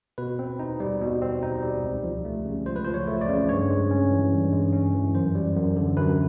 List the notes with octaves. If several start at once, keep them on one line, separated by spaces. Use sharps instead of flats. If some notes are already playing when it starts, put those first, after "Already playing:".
B2 B4
C4
D#4
G3
B2
C4
D#4
G3
C#2
F3
A3
C#3
C#2 C5
B4
F3 C5
C#5
A3
D5
C#3
G2 C#5
G#3
C#4
E3
G2
G#3
C#4
E3
F#2 C5
G3
F#2
D3
F#2 B4